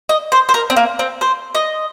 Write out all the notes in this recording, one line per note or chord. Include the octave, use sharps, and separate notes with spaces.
D#5
C5
C5
A#4
C4
A#3
C4
C5
D#5